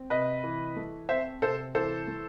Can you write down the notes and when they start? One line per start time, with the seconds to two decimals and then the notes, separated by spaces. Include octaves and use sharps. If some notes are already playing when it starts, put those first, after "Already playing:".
Already playing: C4
0.10 C3 B4 D#5
0.44 E3
0.76 A3
1.09 C4 C5 E5
1.42 C3 A4 C5
1.75 E3 A4 C5
2.07 A3